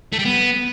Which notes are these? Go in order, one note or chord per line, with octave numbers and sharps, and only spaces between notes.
A3
G3
B3